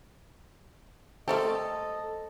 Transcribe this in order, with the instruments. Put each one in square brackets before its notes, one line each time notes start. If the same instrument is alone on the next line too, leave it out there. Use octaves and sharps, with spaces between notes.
[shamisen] G3 A3 G4 [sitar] A4 [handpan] A#4 C5 [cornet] D#5